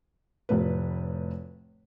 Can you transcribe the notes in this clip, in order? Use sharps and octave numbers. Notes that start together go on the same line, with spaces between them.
F1 A2 B4